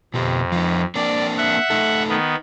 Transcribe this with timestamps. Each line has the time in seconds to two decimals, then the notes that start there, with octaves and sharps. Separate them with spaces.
0.14 F2 B2 G4
0.52 F3 D#4
0.95 A#3 C4 D4 D5
1.37 E5 F#5
1.70 A3 D#4 A4
2.09 D#3 B3